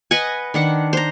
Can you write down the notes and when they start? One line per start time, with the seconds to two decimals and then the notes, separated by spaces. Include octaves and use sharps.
0.11 B4 D#5 F#5 G#5
0.54 D#3 D4 F#5
0.93 C5 A#5